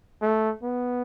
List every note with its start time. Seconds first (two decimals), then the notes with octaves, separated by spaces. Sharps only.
0.22 A3
0.63 B3